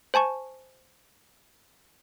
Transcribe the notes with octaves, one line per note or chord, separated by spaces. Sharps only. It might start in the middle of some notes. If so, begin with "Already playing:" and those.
C5 G#5 A5 C#6